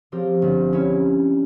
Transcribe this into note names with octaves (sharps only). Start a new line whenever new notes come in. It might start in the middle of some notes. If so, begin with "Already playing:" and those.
F3 C4 G4 A#4
G1
G3 C#4 E4